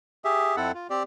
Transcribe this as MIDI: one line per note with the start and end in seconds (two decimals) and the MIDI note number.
0.25 0.56 67
0.25 0.56 68
0.25 0.56 76
0.57 0.72 41
0.57 0.72 60
0.57 0.72 64
0.57 0.72 69
0.57 0.72 78
0.74 0.87 65
0.90 1.03 60
0.90 1.03 67
0.90 1.03 74